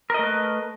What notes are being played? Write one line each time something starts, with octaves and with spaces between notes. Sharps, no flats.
A3 A#4 B4 D#5